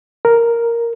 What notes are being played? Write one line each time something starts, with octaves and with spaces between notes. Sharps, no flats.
A#4